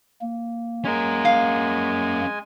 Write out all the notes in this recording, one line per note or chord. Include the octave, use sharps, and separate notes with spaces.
A#3
G#3 C#4 A#4 G#5
F5